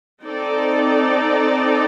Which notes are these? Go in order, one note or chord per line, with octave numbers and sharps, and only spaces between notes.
C4 D#4 A4 D5